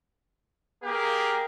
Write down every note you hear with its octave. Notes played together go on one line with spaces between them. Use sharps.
A#3 G4 G#4 A#4